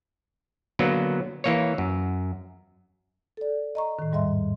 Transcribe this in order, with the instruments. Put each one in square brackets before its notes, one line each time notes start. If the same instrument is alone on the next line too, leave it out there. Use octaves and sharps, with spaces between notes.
[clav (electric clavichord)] D3 F#3 A#3 B3
E3 A#3 C#5
F#2
[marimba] A4 D5
D#5 A#5 C#6
A2 D#3
E2 G#2 G3 D#5 E5 C6